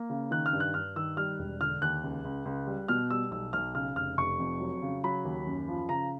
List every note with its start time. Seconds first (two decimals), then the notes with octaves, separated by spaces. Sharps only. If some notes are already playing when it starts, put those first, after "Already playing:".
Already playing: A#3
0.10 C#3
0.31 D#3 F#6
0.46 F6
0.53 G2
0.60 F#6
0.74 G2 F6
0.96 D#3 E6
1.17 G3 F6
1.39 E1
1.61 D3 F6
1.82 D#2 F#6
2.03 C#2
2.25 C#2
2.45 C#2
2.67 G3
2.88 B2 F6
3.10 G3 E6
3.31 B1 E6
3.53 B1 F6
3.75 C#3 F6
3.96 F1 F6
4.17 F1 C#6
4.39 F2
4.60 F#3
4.82 C#3
5.04 F#3 B5
5.25 D#2
5.47 F#2
5.68 F3
5.89 C#3 A#5